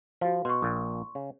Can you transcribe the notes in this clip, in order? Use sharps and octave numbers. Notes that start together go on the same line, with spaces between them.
F3 F#4 F5
B2 C6 C#6
A#1 A#2
C#3